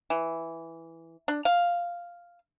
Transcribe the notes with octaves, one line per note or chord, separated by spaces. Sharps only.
E3
D4
F5